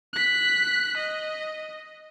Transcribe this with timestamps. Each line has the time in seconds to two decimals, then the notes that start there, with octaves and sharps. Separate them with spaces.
0.13 F#6 B6
0.97 D#5